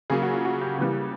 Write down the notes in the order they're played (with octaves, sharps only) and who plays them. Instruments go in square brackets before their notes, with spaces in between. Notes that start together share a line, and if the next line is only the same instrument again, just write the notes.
[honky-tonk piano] C#3 F#3 A#3 G#4
F#4
F4
F#4
G4
C#3 E3 G3 A#3